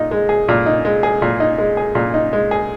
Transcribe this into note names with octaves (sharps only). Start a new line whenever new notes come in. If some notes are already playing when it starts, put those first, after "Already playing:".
Already playing: A#2 D#4
G#3
G#4
A#2
D#4
G#3
G#4
A#2
D#4
G#3
G#4
A#2
D#4
G#3
G#4